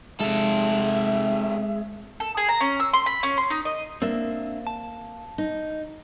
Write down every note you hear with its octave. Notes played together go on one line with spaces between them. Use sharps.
C3 G#3 A4 E5
A4
G#4
A#5
C#4
E6
C6
B5
C#4
C6
D#4
D#5
A#3 C4 D4 E5
A5
D#4